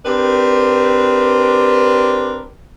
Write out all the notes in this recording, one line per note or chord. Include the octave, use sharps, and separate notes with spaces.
C4 D4 G4 A#4 B4